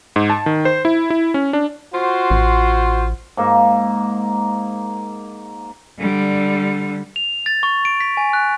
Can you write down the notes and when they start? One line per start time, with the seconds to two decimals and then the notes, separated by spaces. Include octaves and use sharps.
0.16 G#2
0.30 A5
0.46 D#3
0.65 C5
0.85 E4
1.10 E4
1.34 C#4
1.53 D4
1.93 F4 F#4 C5
2.31 A1
3.37 G#2 A#3
5.99 D3 G3
7.16 F7
7.46 A6
7.63 C#6
7.85 D7
8.00 B6
8.17 G#5
8.33 F#6